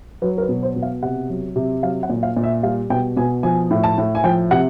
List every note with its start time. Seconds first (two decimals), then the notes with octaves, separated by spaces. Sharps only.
0.22 F#3 B4
0.38 A#4
0.42 B4
0.49 B2
0.63 C5
0.76 B2
0.82 F5
1.02 C3 F#5
1.29 F#3
1.56 C3
1.83 F#3 F5
2.03 F#5
2.10 A#2
2.23 F5
2.36 A#2
2.43 E5
2.63 G3 F5
2.90 B2 G5
3.17 B2 G#5
3.43 F3 G#5
3.71 A2
3.84 A5
3.98 A2
4.15 G#5
4.24 F3 G5
4.51 C3 F#5